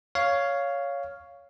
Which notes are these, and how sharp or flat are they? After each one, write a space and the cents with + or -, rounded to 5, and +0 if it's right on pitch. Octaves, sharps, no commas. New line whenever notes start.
C#5 +10 F5 +0